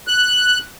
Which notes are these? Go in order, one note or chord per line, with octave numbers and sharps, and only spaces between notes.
F#6